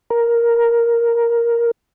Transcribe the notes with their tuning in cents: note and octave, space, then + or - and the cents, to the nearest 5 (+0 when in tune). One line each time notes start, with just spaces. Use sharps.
A#4 +5